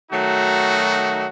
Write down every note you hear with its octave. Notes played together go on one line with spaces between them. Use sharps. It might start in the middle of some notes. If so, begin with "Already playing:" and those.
D#3 F#3 A3 D#4 F#4